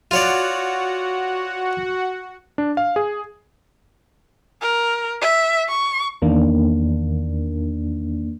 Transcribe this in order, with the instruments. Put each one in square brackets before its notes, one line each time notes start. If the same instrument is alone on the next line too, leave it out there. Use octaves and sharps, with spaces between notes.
[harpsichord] F4 C#5 D5 [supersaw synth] F#4 F#5
[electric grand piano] D4
F5
G#4
[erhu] A#4
E5
C#6
[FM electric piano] E2 D#3 A#3 D4